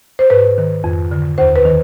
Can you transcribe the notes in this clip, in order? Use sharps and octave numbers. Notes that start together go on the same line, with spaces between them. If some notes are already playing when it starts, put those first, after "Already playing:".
C5
G#2 B4
D#3
F2
D3
D#2 C5
B4
D#3